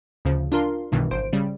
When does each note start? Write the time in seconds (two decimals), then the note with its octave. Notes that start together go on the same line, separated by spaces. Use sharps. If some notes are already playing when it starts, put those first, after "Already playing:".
0.25 D2 C#3 F3
0.52 D4 F4 A#4 C6
0.92 B1 G2 B2 D#3 E3
1.11 G#1 C5 D7
1.33 C#3 G3